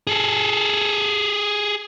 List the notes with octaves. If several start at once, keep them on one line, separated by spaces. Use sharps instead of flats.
G#4 A4